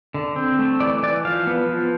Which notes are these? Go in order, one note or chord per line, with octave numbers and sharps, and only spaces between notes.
D3
C4
A3
E3 D5
E3 D5
F3 F5
B3
F3